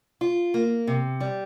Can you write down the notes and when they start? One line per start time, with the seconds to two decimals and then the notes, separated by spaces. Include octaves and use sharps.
0.21 F4
0.54 A#3
0.87 C3
1.21 G3